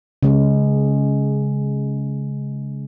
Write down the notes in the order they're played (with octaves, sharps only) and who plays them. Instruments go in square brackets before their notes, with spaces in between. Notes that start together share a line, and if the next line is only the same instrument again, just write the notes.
[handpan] C#3 G#3